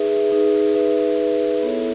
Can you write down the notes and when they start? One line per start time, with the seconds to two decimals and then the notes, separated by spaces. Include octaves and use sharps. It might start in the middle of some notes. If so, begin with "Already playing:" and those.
Already playing: D#4 G#4 B4 E5
0.32 D#4 G#4 B4 E5
0.74 D#4 G#4 B4 E5
1.18 D#4 G#4 B4 E5
1.62 B3 E4 A4 C#5 E5